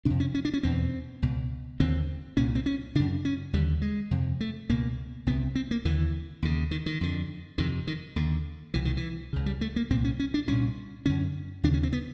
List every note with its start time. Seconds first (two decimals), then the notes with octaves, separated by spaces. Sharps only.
0.05 F2 C3 D4
0.20 C#4
0.35 C#4
0.45 D4
0.54 C#4
0.63 E2 B2 C4
1.22 C#2 B2
1.80 D#2 D3 C4
2.37 C2 A#2 C#4
2.55 C4
2.66 C#4
2.95 C#3 D4
2.99 F#2
3.25 C#4
3.53 D#2 D3 G3
3.82 G#3
4.11 F2 C3
4.40 A3
4.69 C#2 B2 A#3
5.26 C2 C3 B3
5.55 C4
5.71 A#3
5.85 D#2 D3 E3
6.42 D#2 C#3
6.71 D#3
6.86 D#3
7.01 F2 D3
7.58 F2 C3 D#3
7.87 D#3
8.16 D#2 D3
8.74 C2 B2 E3
8.85 D#3
8.97 E3
9.33 C#2 C#3
9.46 G3
9.61 A3
9.76 A#3
9.90 C2 A#2 C4
10.04 C#4
10.19 C#4
10.34 D4
10.47 C2 A#2 C#4
11.06 F#2 D3 C#4
11.63 D#2 C#3 D4
11.74 C#4
11.83 C4
11.93 B3